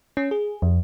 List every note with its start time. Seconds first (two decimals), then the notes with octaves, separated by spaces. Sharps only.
0.17 C#4
0.31 G#4
0.62 F2